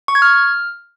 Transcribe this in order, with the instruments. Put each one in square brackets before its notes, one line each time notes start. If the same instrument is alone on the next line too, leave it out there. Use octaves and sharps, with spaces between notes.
[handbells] C#6
G#6
F6